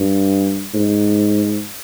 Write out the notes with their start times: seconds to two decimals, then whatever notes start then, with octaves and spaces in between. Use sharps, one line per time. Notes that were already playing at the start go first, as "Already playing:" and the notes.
Already playing: G2
0.74 G#2